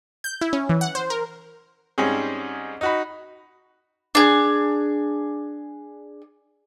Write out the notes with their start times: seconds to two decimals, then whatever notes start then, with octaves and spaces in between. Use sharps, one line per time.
0.24 G6
0.41 E4
0.53 C#4
0.69 E3
0.81 F#5
0.95 C5
1.10 A#4
1.98 G#2 G3 C4 C#4 G#4
2.81 D#4 F#4 B5
4.15 D4 G#4